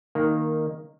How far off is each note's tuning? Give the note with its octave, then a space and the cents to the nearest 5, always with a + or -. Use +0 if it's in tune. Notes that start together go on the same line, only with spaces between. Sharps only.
D#3 +0 A#3 -5